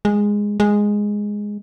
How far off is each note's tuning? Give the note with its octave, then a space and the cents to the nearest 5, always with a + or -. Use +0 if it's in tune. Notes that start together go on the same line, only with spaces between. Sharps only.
G#3 -10
G#3 -5